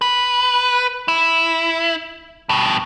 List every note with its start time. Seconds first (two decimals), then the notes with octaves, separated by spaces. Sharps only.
0.02 B4
1.08 E4
2.49 G2 B2